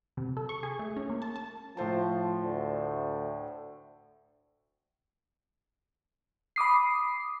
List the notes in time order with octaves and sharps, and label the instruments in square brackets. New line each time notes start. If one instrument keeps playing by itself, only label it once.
[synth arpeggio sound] C3
A4
C#6
G#4
A3
C#4
A#3
A5
A5
[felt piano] A2 C5 A5 [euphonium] F3
[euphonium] D2
[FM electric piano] B5 D6 D#6 C7